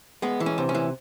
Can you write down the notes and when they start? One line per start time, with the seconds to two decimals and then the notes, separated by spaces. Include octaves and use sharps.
0.22 G#3 B3
0.40 E3
0.46 C#4
0.58 C3
0.69 C#4
0.75 E3